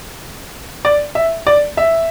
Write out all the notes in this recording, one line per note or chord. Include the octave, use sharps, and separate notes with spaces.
D5
E5
D5
E5